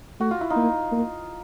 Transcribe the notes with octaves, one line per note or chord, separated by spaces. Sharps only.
A3 F#4
F4
E4
D#4 F4
A#3
A#3